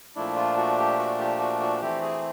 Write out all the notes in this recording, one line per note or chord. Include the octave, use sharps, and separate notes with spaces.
A#2 F3 A3 D4 E4
F4
F#4
G4
F#4
G4
F#4
F#4
E3 A3 C4 G4
G#4